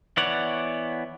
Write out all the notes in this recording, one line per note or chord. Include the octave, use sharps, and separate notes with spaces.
E3 B3 C#5 D5 F#5